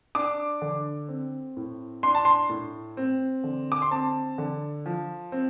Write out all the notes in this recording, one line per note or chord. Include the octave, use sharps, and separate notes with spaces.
D4 D6
D3
C4
A2
D4 C6
A5
C6
A2
C4
D3
D6
C6
C4 A5
D3
F3
C4